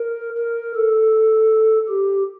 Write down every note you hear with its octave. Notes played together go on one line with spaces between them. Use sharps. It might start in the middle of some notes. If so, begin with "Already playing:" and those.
Already playing: A#4
A#4
A4
G4